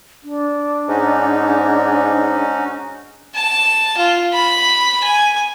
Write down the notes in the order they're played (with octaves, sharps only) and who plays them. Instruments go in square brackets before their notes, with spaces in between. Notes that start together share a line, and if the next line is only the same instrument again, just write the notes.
[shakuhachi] D4
[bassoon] G#2 [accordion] C#4 D#4 F#4
[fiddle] A5
F4
B5
G#5